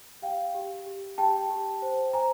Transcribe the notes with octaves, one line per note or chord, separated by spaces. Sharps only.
G4 F5 G5
G4
G4
G4 G5 A5
G4
C5
C5 G#5 A#5